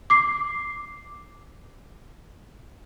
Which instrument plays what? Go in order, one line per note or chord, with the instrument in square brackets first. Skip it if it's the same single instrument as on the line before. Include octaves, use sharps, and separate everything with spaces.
[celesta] D6 C7